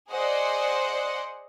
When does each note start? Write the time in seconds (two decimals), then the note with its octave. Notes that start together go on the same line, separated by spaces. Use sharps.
0.11 G#4 C5 D5 D#5 F#5